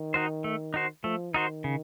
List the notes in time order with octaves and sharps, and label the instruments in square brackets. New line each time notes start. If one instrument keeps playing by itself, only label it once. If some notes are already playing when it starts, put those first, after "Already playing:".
Already playing: [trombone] D#3
[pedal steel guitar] D#4 F#4 C5
A3
D#4 F#4 C5
[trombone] F3 [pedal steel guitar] A3
[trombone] D#3 [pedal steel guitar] D#4 F#4 C5
[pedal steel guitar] C#3